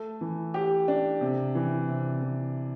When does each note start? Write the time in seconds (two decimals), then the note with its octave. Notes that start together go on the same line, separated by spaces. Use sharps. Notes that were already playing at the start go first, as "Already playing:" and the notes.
Already playing: A3
0.21 E3
0.54 G4
0.88 D4
1.21 C3
1.55 E3
1.89 C3
2.22 E3